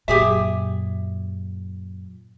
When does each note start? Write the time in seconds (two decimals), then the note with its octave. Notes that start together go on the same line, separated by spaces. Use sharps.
0.08 F#2 A#2 G4 G#4 E5